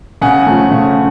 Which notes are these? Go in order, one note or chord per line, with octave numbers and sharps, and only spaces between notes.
C#3 F#5 G#5
F3 A3
C#3